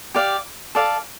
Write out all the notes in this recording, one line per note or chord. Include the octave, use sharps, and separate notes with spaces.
G4 D5 F5
A4 D5 F5